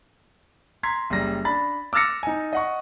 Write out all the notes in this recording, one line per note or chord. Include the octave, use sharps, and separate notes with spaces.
A#5 C6 G#6 B6
F#1 G3 A#6
D4 B5 A6
D6 E6 F6 A6 A#6 C#7
D#4 G#5
D#5 F#5 C#6